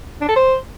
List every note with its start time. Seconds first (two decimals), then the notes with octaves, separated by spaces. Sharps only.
0.21 D4
0.28 A4
0.36 C5